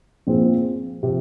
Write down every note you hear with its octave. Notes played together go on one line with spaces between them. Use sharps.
A#2 F3 C4 G#4
C3 F3